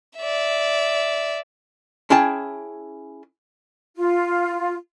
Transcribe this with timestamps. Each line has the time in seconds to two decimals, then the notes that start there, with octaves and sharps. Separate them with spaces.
0.17 D5 E5
2.10 C#4 E4 G#4 G5 A5
3.96 F4